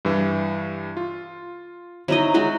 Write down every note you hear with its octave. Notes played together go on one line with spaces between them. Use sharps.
G2 E3
F4
F#3 D#4 E4 D#5
F#3 G#3 F#4